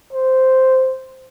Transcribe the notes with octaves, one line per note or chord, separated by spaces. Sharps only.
C5